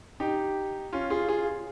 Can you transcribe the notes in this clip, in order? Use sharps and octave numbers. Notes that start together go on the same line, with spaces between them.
D#4 G4
C#4 F4
F4 G#4
F4 G#4